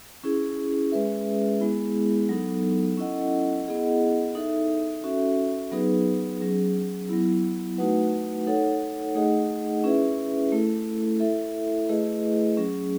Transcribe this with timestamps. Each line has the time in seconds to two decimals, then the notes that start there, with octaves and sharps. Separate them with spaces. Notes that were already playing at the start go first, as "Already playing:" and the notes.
0.24 C#4 E4 G#4
0.92 G#3 C#4 G#4 B4 E5
1.60 G#3 B3 E4 G#4
2.29 F#3 B3 D#4 A4
2.97 C#4 E4 A4 D#5 F#5
3.66 B3 E4 G#4 D#5 F#5
4.35 D#4 A4 E5
5.04 C#4 F#4 A4 E5
5.72 F#3 B3 D#4 G#4 B4
6.40 F#3 C#4 G#4
7.09 F#3 B3 E4
7.78 A3 D#4 F#4 B4 F#5
8.47 D#4 A4 C#5 F#5
9.15 A3 D#4 G#4 D#5 F#5
9.84 C#4 E4 G#4 B4 E5
10.52 A3 E4 A4
11.20 E4 A4 E5
11.89 A3 E4 G#4 B4 D#5
12.57 F#3 C#4 G#4